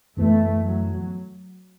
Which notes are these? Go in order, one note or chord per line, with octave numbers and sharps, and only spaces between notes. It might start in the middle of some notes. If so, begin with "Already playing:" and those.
F#2 E3 A3 B3
F#3